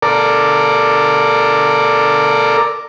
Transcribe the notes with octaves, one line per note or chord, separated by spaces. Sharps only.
A4 A#4 D5